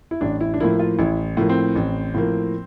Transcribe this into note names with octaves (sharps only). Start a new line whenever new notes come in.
E4
A1 D4
E4
D4
A2 F3 A#3 E4
F4
A1 E4
A2 F3 A#3
C4
A1
A2 F3 A#3